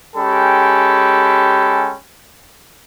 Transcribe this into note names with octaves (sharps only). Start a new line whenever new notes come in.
G#3 C#4 G4 A4 G5 B5